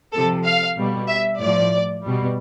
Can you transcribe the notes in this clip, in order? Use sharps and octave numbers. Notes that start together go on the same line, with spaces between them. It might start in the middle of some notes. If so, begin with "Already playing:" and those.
C3 F3 A4
F5
B2 G3
E5
A2 F3 D5
B2 G3